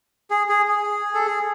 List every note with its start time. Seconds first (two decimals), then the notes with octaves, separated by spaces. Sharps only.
0.30 G#4
0.49 G#4
0.68 G#4
1.14 A4
1.27 G#4